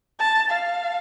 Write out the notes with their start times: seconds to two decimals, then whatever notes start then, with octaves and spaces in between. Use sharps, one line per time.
0.20 A5
0.51 F5